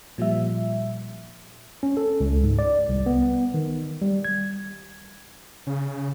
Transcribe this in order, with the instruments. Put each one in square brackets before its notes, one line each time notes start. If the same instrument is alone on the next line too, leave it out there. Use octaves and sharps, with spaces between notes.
[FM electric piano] A#2 F3 G3 E5
[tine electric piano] C#4
A4
C#2
G#2
D5
C2
B3
D#3
G3
G#6
[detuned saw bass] C#3